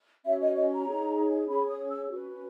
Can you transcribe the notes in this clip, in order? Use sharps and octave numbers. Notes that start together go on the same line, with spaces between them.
C#4 F#4 C#5 E5
D#5
D#5
A#5
D#4 G#4 C#5
C#4 G#4 C#5 B5
D#6
E6
C#4 F#4 B4